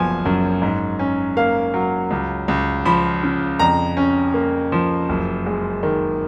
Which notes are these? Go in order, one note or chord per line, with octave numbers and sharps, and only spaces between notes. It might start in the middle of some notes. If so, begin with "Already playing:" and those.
Already playing: F#1 F3 B3 G#5
F#2
G#2
C#4
A#3 F5
F#3
C#2
C#2
F3 B5
C#3
F2 A#5
C#4
A#3
F3
F#1
G#3
D#3